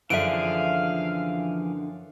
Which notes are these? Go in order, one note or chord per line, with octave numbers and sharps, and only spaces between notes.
F#2 D3 E3 F3 G#4 E5 F5 D7